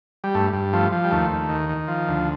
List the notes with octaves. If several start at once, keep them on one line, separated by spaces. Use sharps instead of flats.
G3
G2 A3
G2
F3 A3
F3
G3
D#2 A3
D#2
D#3
D#3
F3
D2